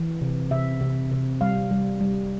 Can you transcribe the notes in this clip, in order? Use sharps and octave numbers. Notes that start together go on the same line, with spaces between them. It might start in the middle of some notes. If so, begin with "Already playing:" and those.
Already playing: E3
C3
C3 E5
C3
C3
G3 F5
G3
G3